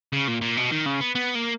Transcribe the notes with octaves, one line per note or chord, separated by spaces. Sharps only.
C#3
A#2
A#2
B2
D#3
C#3
B3
B3
A#3